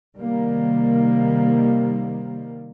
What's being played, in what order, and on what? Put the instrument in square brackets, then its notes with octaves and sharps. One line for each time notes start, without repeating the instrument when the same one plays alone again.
[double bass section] C3 D#3 G3 A#3